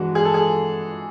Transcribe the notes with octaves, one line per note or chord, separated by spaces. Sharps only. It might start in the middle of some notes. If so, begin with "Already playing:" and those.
Already playing: E3 G#3 D4 F#4
G#4
A4
G#4